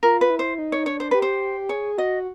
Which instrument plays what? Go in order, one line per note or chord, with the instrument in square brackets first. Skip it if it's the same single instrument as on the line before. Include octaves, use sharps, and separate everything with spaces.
[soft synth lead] F4 [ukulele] A#4
[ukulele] B4
[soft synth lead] E4
[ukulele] C5
[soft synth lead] D#4
[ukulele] C#5
[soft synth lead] D4 [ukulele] C#5
[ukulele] C5
[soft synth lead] G4 [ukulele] B4
[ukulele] C5
[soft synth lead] G#4 [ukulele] C#5
[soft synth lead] F#4 [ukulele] D#5